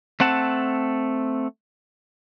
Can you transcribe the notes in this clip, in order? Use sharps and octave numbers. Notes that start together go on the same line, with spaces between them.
A3 C4 F#5 A5